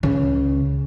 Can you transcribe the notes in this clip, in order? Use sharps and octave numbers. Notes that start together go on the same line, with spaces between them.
C#2 C#3